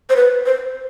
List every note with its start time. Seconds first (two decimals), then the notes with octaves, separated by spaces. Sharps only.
0.10 C5
0.16 B4
0.46 C5